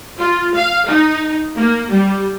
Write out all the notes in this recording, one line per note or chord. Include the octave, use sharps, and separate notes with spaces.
F4
F5
D#4
A#3
G3